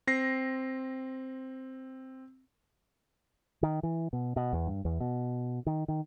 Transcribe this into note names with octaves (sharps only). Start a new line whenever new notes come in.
C4 A#6 C7
D#3
E3
B2
B2
E2
G2
E2
B2
D#3
D#3